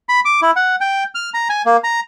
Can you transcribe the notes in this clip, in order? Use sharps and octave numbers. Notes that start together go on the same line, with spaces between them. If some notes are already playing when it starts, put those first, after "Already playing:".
B5
D6
E4
F#5
G5
F6
A#5
G#5
A#3
A#5